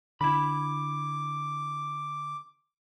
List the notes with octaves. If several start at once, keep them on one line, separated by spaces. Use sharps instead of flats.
D3 E4 B5 D6